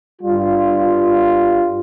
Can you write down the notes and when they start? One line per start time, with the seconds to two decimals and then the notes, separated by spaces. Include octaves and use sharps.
0.22 G2 G3 F4